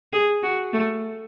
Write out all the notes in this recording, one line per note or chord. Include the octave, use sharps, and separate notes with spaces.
G#4
F#4
A3